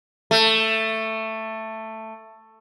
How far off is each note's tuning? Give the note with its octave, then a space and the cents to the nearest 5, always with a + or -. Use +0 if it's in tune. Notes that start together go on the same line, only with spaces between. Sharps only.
A3 +10